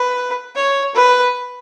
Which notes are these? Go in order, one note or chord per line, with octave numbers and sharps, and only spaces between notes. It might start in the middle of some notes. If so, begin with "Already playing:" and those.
Already playing: B4
C#5
B4